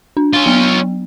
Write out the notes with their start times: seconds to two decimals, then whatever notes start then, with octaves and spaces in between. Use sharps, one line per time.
0.17 D4
0.33 C#4 F4
0.46 F#3 B3